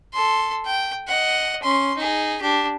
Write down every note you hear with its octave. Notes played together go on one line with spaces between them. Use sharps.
A4 C6
G5
D#5 F#5
C#4 C6
D#4 G#4
D4 G4